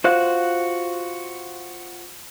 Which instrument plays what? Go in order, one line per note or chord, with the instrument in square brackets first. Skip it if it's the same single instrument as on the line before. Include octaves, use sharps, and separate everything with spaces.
[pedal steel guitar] F4 F#4 C5 F5 F#6